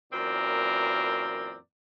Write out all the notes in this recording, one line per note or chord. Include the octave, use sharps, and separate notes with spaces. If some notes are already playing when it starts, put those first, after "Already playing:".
F#2 A#2 E3 C4 A#4 D5